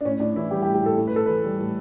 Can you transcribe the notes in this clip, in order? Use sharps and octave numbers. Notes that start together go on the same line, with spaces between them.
D4
A2 C#4
A2 D4
E3 E4
G3 G4
G4
A2
G4
A2 A4
A2
B4
A2 A4
E3 B4
G3
A2